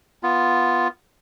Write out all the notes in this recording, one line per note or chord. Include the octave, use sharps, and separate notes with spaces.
B3 F4